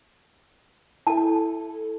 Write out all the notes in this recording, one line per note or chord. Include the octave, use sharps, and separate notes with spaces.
E4 A4 A5